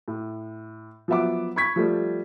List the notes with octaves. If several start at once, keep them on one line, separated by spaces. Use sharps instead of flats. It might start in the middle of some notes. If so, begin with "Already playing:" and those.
A2
F3 F#3 B3 E5 F#5 D6
B5 C#6 G#6 B6
F3 G3 A3